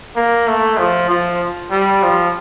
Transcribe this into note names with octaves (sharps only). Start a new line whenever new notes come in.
A#3
A3
F3
F3
G3
F3